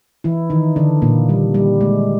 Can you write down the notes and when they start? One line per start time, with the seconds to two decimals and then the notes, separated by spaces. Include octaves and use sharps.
0.24 E3 E4
0.50 D#3 D#4
0.76 D3 D4
1.02 A#2 A#3
1.29 G3
1.54 G3
1.81 G#3